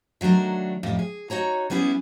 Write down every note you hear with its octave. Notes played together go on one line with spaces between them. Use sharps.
D#3 F#3 A3 D4 A#4
F2 A2 D#4 G4
G#4
D#4 F#4 C#5 A#5
G3 B3 C#4 E4 G#4